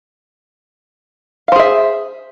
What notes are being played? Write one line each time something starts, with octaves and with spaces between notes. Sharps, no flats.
G#4 C5 E5 F5